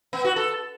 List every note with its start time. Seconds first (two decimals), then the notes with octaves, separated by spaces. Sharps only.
0.13 B3
0.25 F#4
0.36 A4